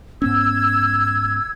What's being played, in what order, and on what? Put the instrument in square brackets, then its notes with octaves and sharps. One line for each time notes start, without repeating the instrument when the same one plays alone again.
[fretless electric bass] G#2 B3 C#4 [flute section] E6 G#6